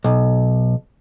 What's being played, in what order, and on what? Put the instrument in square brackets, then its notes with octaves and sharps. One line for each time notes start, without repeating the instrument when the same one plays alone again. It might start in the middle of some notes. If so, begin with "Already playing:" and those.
[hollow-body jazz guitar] B1